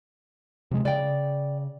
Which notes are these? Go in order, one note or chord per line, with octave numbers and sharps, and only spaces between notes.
C3 F3 G#3
C#3 D5 G5